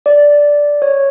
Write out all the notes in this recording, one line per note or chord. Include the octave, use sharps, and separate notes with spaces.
D5
C#5